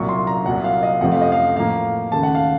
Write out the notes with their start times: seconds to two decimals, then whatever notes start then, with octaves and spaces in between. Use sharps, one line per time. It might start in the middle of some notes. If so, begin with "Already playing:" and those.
Already playing: C2 A#2 F#3 C#6
0.09 C6
0.27 A#5
0.46 C2 A#2 F#3 F#5
0.64 F5
0.83 D#5
1.01 F2 C3 F3 A3 F#5
1.12 F5
1.22 D#5
1.32 F5
1.56 A2 F3 A#3 F5
2.12 D#2 C#3 A3 A5
2.23 F#5
2.35 F5